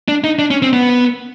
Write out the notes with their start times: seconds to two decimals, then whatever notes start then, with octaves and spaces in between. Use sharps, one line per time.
0.08 D4
0.24 D#4
0.39 D4
0.51 C#4
0.62 C4
0.73 B3